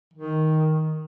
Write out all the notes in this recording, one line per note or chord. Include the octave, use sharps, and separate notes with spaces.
D#3